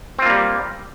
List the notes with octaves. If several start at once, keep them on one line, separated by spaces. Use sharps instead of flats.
G3 A#3 C4 F4